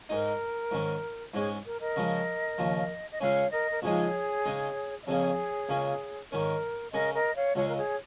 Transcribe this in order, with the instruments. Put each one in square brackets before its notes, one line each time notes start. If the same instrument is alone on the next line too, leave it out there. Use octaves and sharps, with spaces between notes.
[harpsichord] G#2 G#3 D#4 [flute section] A#4
[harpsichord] G#2 D#3 C#4
[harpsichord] G#2 G#3 C#4 [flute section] G#4 C#5
[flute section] A#4
A#4 D#5
[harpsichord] C#3 F3 G#3
D#2 C#3 F3
[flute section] D#5
[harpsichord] C#2 C#3 G#3 C#4 [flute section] C#5 F5
[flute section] A#4 D#5
A#4
[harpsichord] C#2 C#3 F3 G#3 D#4 [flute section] G#4 C#5
[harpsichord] C#3 G#3 D#4
[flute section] D#5
[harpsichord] F2 C#3 A#3 C#4 [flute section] G#4 C#5
[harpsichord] C#2 C#3 A#3 C#4
[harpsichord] G#2 D#3 C#4 [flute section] A#4
[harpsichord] C#3 G#3 C#4 [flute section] A#4 D#5
[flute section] A#4 D#5
C#5 F5
[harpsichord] C#2 C#3 G#3 [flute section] C#5 F5
[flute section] A#4
G#4 C#5